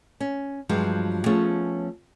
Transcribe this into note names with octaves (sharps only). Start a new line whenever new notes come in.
C#4
G2 F3 F#3 G#3
F3 A3 B3 C#4 G#4 C#5